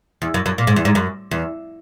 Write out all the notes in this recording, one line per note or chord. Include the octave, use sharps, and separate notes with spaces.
E2
F#2
F#2
A#2
G#2
E2
G#2
F#2
E2